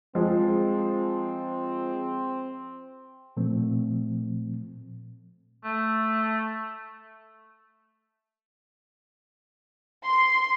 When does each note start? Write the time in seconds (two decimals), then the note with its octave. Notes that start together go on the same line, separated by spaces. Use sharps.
0.15 F3 G#3 C4
3.37 A#2 F3 A3 C4
5.65 A3
10.05 C6